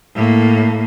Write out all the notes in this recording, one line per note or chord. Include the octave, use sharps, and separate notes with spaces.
A2 A#3